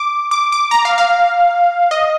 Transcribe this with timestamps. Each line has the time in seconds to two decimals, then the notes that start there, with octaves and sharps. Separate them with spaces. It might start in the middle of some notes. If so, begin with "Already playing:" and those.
Already playing: D6
0.31 D6
0.52 D6
0.71 A#5
0.85 F5
0.98 F5
1.91 D#5